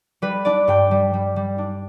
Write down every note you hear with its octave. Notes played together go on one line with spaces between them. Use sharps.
G3 B4
D4 D5
G2 G5
G3
G3
G3
D4